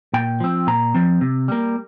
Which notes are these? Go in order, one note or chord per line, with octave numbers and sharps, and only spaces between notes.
A#2 G5
F3 C4
A#2 A#5
F3 C4
C3
G3 A#3